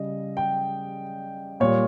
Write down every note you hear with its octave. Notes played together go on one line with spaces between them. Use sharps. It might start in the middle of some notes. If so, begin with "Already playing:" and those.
Already playing: C#3 G3 D#5
G5
A#2 G3 C#5